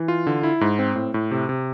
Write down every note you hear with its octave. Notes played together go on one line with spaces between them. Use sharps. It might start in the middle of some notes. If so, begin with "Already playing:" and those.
Already playing: E3
F4
D3
E4
G#2
C4
A2
A2
C3
C3